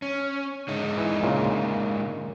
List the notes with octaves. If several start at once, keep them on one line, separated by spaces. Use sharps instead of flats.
C#4
D3 G#3 D#4
E3
A#2 C#3